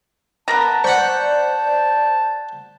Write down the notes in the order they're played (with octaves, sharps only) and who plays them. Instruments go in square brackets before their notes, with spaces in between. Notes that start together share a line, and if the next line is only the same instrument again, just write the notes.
[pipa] B3 A#4 A#5 [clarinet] A5 [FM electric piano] A6
[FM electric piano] C5 D5 G6 [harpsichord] F#5 B5 C#6